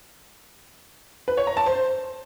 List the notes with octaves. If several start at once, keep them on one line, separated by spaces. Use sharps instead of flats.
B4
C#5
A#5
A5
C5